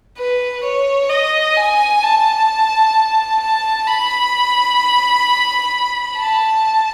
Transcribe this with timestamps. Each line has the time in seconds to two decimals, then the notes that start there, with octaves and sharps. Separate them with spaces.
0.18 B4
0.64 C#5
1.09 D#5
1.56 G#5
2.03 A5
3.41 A5
3.87 B5
6.18 A5